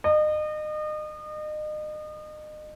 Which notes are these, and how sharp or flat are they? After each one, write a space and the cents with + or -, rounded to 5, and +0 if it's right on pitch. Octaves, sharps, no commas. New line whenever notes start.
D#5 -35